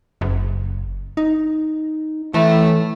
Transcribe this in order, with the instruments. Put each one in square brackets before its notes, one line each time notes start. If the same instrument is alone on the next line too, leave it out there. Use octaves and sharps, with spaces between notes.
[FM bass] F#1
D#4
[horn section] A2 A3 [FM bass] E3